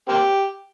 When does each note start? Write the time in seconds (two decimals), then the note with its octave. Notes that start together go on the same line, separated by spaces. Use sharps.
0.09 A#3 C4 G4